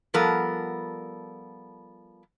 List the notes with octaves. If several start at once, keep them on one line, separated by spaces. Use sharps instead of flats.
F3 G3 B3 A4 A#4